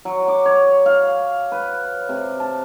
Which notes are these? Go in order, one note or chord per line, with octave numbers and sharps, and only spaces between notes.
F#3
D6
C#5
F5
B4
C3
A5